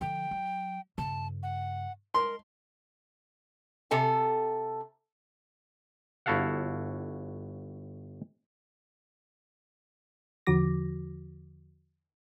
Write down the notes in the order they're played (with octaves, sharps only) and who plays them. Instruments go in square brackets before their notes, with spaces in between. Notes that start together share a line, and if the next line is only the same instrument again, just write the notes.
[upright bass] D3 F3 [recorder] G5
[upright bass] F#3
[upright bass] G2 C#3 [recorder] A5
[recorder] F#5
[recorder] A#4 [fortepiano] C6
[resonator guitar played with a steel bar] C3 A4 G#5
[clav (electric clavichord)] G1 E4 F#4 A4 F5 F#5
[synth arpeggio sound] E2 D3 F3 F#4 D6 A#6